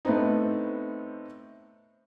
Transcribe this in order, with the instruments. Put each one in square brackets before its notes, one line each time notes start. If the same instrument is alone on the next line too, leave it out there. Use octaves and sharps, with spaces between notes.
[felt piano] A2 A3 B3 C4 D#4